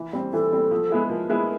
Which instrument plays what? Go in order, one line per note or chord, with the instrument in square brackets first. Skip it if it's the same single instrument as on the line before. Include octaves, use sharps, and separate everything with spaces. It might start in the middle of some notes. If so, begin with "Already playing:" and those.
Already playing: [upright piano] E3
G3 C4
[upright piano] E3 [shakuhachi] A4
[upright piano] G3 C4
F3
G#3 B3 E4 G#4
[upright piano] F3 [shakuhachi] A#4
[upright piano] G#3 B3 E4 G#4